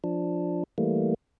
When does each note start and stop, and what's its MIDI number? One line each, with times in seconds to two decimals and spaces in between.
0.04 0.64 53
0.04 0.64 62
0.78 1.14 52
0.78 1.14 55
0.78 1.14 57
0.78 1.14 58